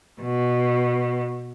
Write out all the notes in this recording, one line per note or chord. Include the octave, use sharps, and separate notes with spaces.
B2